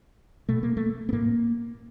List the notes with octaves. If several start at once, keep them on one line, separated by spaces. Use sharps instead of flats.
B2 A3
A#3
A3
B3
A2 A#3